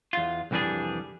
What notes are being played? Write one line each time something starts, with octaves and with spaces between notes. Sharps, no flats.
E2 F4
C2 F2 E3 G3 D4 G#4